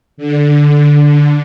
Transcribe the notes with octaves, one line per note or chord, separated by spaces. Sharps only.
D3